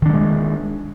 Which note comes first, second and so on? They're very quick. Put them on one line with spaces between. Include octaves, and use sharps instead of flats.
D#3 D4 G3 G#3